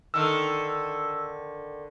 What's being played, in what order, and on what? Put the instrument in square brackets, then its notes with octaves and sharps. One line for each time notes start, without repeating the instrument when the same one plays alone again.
[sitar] D3 D#3 [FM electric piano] E6